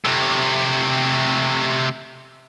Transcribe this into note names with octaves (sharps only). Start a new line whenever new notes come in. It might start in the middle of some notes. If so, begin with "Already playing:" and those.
C3 A3